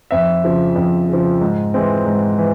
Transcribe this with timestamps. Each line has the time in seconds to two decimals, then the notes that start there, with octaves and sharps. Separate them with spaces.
0.11 F2 E5
0.44 C#3 F3
0.76 F2
1.09 C#3 F3
1.41 G#2
1.74 E3 G#3 C4
2.07 G#2
2.38 E3